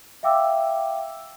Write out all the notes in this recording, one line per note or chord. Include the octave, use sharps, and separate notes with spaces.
E5 F5 G5 D6 E6